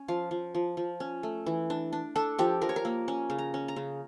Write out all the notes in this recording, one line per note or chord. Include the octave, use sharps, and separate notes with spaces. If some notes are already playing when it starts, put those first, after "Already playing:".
Already playing: C#4
F3 F5
F3
F3
F3
C#4
A3
E3
D4
D4
D4 A4
F3 G4
F3 A#4
C#5
A#4
A#3
C#4
C#3
A#5
C#4
A#5
C#3